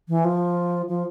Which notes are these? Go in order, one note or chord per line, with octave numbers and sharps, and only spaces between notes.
E3
F3
F3